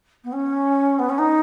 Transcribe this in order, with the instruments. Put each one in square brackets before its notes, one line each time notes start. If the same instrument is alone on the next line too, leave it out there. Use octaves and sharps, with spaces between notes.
[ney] B3
C#4
B3
C#4
D#4